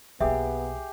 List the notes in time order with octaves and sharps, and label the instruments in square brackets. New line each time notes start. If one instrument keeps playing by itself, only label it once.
[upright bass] B1 A#3 [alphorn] B3 [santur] G4 G#4 [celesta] E5